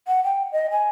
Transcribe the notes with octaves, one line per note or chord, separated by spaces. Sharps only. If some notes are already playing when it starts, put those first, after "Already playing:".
F#5
G5
D#5
G#5